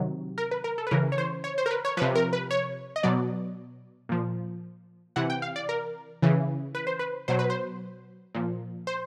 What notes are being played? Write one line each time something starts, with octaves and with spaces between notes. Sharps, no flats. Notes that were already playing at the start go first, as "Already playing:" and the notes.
Already playing: C3 D#3 F#3
A#4
B4
A#4
A4
B4
C#3 E3 A#4
C#5
C5
C#5
C5
A#4
B4
C#5
C3 F3 B4
A#4
B4
C#5
D#5
B2 F#3 D5
A#2 F3
C3 E3 F#5
G5
F5
D5
A#4
C#3 E3
B4
C5
B4
B2 F#3 C5
B4
C5
A#2 F3
C5